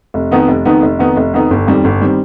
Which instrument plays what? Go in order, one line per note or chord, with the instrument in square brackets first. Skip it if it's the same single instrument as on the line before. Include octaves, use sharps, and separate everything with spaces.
[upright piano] F1
F2 D#3 B3 D#4
F1
F2 D#3 B3 D#4
F1
F2 D#3 B3 D#4
F1
F2 D#3 B3 D#4
G1
F2 D#3 G3 C4
G1
D#3 G3 C4